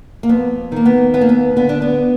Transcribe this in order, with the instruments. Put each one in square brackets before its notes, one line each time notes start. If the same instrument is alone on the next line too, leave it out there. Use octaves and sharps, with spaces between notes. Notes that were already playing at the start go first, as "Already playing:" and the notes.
[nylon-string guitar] A#3
F2 B3
D#3 A#3
B3
D#2 B3
A#3
B3
D3 B3
D4
B3